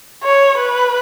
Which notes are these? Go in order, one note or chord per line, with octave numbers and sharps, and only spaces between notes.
C#5
B4